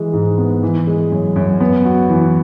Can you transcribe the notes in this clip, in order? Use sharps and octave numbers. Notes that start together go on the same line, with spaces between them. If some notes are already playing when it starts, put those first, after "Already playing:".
Already playing: E3 G#3
G#2
B3
E3
G#3
F#2
F#2
B3
F#4
E3